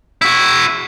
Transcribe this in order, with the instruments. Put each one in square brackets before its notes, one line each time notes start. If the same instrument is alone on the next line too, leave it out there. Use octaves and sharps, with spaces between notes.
[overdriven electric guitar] E4 F#4